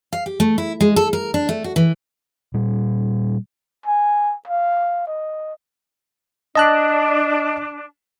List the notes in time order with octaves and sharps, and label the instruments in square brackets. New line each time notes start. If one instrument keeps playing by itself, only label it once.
[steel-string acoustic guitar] F5
G4
A3
E4
G#3
A4
A#4
D4
A3
F#4
E3
[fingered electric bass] A#2 G3
[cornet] G#5
F5
D#5
[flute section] D4 [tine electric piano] D#5 A5 F#6